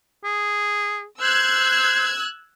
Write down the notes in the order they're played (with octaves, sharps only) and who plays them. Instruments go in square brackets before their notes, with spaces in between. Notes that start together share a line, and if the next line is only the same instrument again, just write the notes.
[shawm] G#4
[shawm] C5 [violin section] E6 F#6 G#6